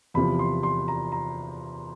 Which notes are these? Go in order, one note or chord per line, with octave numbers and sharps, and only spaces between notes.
E2 C3 F3 B5
C6
C6
A#5
A#5